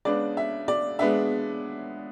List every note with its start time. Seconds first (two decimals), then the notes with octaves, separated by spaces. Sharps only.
0.05 C#3 G#3 B3 D4 D5
0.37 E5
0.68 D5
0.99 G#3 B3 D4 E5